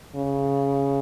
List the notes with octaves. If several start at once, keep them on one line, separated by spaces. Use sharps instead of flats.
C#3